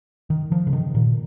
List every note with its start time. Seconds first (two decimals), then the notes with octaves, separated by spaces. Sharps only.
0.30 D#3
0.52 F3
0.67 C#3
0.73 D#3
0.95 A#2